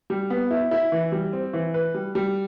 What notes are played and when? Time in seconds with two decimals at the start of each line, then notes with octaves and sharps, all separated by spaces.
0.10 G3
0.30 B3
0.51 E4
0.71 E4
0.92 E3
1.12 G3
1.33 C4
1.53 E3
1.74 B4
1.94 G3
2.15 G3